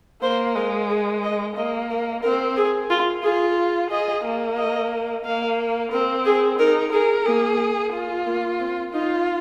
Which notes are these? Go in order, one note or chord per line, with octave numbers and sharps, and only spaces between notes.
A#3 C5
G#3 A#4
G#4
D#5
A#3 D#5
A#4
C4 A#4
G#4
F4
F4 G#4
G#4 D#5
A#3
D#5
A#3 F5
C4 A#4
G#4
D#4 A#4
G#4 A#4
A#3 G#4
F4
A#3
C4
D#4 F4